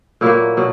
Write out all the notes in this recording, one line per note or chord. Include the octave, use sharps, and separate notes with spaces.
A#2 F#3 A#3 E4
B2 F#3